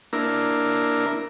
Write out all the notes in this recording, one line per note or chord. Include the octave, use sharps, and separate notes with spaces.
A#3 D4 E4 A#4